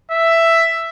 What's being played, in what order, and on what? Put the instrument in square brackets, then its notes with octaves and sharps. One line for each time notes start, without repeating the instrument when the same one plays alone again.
[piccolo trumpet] E5